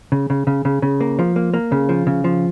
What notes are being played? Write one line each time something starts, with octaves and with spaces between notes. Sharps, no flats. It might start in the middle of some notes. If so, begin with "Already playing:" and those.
C#3
C#3
C#3
C#3
C#3
A#3
F3
A#3
A#3
C#3
F3
C#3
F3